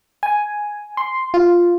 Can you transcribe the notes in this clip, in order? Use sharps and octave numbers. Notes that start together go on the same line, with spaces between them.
G#5
C6
F4